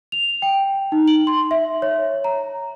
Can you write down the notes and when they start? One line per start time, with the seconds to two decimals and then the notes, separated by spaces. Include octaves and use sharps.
0.12 F7
0.42 G5
0.92 D#4
1.08 F#7
1.27 C6
1.51 E5
1.82 C#5
2.24 A#5